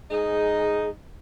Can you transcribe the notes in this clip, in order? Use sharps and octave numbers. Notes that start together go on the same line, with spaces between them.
G#2 D#4 G#4